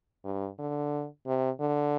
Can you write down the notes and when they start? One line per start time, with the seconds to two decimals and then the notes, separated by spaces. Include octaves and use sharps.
0.25 G2
0.59 D3
1.26 C3
1.60 D3